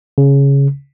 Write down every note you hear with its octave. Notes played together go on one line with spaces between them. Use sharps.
C#3